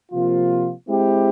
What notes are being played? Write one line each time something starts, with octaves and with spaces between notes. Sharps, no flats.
C3 F3 A#3 F4
G#3 C4 E4 G4